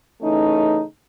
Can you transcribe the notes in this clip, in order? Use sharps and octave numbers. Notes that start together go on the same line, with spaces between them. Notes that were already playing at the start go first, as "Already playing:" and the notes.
C#3 E3 A3 C#4 D#4